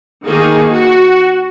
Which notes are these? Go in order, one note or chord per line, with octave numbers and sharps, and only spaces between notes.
D#3 A#3 D#4 G#4
F#4